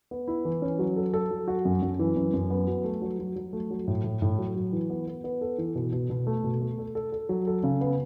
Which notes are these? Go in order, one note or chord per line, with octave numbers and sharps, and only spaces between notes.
B3
E4
E3
C#4
F#3
A4
A4
F#3
F#4
F#2
F#2
E3
F#2
F#2
B3
F#3
A3
F#3
F#3
F#3
A3
F#3
A2
A2
A2
F#3
F#3
E3
B3
B3
B3
A4
E3
B2
B2
B2
A3
B2
A3
A4
A4
A4
F#3
A4
C#3
B3